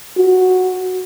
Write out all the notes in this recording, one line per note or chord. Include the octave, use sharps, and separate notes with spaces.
F#4